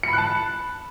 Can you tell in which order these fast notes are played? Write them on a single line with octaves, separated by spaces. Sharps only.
C#7 B5 F#6 A5